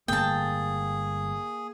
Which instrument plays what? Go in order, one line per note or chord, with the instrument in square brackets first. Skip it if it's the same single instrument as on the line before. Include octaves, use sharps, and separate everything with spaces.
[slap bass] G1 A2 D3 [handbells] A#3 [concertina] G#4 [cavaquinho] G5 A5